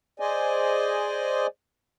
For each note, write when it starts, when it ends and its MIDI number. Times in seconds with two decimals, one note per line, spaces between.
0.20 1.47 68
0.20 1.47 72
0.20 1.47 74
0.20 1.47 75
0.20 1.47 80